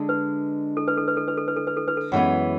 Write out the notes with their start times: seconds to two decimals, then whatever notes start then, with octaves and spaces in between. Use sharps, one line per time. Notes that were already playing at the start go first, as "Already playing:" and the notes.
Already playing: D3 G#3 D4
0.09 B4
0.77 A4
0.88 B4
0.97 A4
1.08 B4
1.17 A4
1.28 B4
1.37 A4
1.48 B4
1.57 A4
1.67 B4
1.77 A4
1.88 B4
1.97 A4
2.12 F#2 E3 G#3 B3